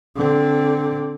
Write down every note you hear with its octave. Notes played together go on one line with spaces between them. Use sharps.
D3 C4